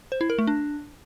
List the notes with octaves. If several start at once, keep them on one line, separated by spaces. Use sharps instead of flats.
C5
E4
A#4
A3
D4